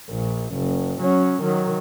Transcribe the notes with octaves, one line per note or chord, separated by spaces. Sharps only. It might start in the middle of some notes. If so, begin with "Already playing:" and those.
A#1
F#1
F#3 C#4
D#3 F#3